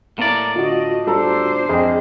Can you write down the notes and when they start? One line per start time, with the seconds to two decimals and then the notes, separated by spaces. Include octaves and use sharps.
0.18 A2 A#3 E4 D5 A#5
0.56 D3 F4 F#4 D#5
1.07 G3 D4 A4 C5 A#5
1.69 F2 G#4 D#5 G5